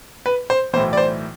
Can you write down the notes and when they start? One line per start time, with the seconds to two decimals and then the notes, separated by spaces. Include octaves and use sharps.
0.26 B4
0.50 C5
0.73 B1 A2 E3 C5
0.93 D5
0.97 C5